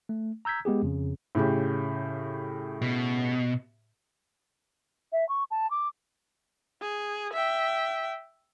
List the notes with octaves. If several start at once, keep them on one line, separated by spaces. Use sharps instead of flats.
A3
A#5 E6 G6 G#6 B6
G#3 B3 G4 G#4
F2 C#3
A2 C#3 G4
B2
E5
C#6
A5
D6
G#4
E5 G5